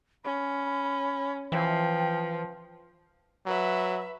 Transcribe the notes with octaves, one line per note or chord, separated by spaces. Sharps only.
C#4 B5
E3 F3 G5
F#3 B4 E5